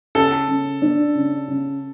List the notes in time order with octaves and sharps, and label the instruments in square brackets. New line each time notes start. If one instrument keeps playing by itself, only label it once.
[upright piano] C#3 [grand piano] A4
[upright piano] C#3
D4
C#3
C#3